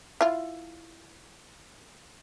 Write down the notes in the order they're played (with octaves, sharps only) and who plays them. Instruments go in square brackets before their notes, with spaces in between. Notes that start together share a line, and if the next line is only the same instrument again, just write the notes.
[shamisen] E4 F4